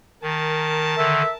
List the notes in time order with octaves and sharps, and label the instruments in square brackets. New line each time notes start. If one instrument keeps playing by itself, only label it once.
[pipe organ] D#3 [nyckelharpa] A#4 A5
[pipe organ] D3 D#3 [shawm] E5